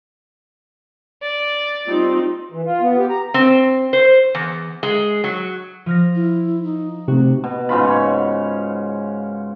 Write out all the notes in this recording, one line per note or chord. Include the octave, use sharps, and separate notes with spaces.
D5
G3 C4 D#4 F4
E3
F4
B3
G4
A#5
C4
C5
E2
G#3
F#3
F3 F6 A#6
E4
D#4
C3 A3 F#4
B2
G#2 C#3 F4 B5
C#5 C#6